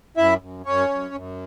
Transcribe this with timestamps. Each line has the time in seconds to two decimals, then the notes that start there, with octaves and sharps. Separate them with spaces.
0.17 F#2 E4 E5
0.41 F#2
0.66 F#2 C#4 C#5
0.89 F#2
1.14 F#2